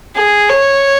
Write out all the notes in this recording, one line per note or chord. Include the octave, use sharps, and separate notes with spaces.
G#4
C#5